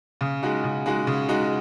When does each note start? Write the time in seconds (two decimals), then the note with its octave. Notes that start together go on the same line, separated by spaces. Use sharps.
0.21 C#3
0.43 G#3 D#4 F#4
0.64 C#3
0.86 G#3 D#4 F#4
1.07 C#3
1.29 G#3 D#4 F#4